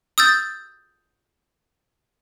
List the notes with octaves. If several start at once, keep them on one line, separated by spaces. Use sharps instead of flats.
D#6 E6 G6 A6